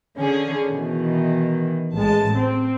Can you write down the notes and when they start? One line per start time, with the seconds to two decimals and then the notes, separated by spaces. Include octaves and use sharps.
0.19 D3 C#4 G#4
0.70 B2 D#3 E3
1.95 A1 G#3 A5
2.36 C4